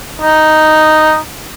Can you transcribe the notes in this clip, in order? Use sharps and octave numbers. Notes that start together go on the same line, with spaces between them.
D#4